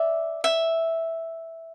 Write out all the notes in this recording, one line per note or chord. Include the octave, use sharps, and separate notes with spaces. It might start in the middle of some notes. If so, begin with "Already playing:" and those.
Already playing: D5 E5
E5